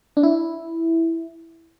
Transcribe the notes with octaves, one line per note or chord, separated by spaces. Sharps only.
D4
E4